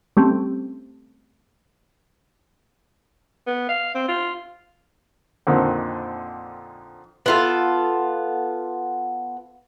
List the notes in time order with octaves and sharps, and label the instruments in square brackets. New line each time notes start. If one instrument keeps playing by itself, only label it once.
[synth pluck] G3 A3 C4 C#4 G4
[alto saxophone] B3
F5
C4
F4
[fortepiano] F2 A#2 D3 D#3 C4
[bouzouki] B3 F4 A4